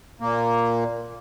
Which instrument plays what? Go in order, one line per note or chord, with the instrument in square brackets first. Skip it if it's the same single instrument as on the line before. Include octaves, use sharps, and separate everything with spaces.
[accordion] A#2 A#3